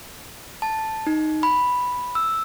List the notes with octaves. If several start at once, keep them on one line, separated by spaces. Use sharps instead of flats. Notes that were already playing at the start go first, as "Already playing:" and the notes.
A5
D#4
B5
E6